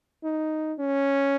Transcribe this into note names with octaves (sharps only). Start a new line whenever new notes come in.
D#4
C#4